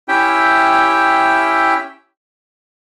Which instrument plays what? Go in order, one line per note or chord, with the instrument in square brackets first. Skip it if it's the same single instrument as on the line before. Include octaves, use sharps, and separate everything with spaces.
[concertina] C#4 E4 G4 E5 G5